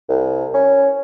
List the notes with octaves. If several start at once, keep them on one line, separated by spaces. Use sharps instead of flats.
C2
C#4